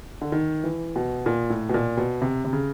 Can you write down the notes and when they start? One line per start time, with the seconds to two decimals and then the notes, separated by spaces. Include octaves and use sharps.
0.21 D3
0.32 D#3
0.64 E3
0.96 B2
1.26 A#2
1.50 A2
1.69 B2
1.74 A#2
1.97 B2
2.22 C3
2.45 C3
2.53 C#3